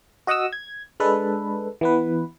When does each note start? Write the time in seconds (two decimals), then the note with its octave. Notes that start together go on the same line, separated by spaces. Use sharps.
0.27 F#4 D#5 F#5 D#6 E6
0.53 G#6
1.00 G#3 D4 A4 B4
1.81 E3 B3 B4